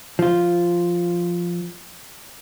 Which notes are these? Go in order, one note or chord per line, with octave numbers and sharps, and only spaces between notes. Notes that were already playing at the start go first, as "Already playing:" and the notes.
F3 F4